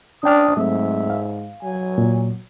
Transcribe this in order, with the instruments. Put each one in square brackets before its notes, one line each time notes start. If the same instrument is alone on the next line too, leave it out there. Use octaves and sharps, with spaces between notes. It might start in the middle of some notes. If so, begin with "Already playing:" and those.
[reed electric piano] C#4 G5 F6 [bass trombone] D4 [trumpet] D#6
[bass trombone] G#2 [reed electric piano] F#3 A3 C4 [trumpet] E5
[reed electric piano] F5
[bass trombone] F#3 [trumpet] G#5
[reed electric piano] A#2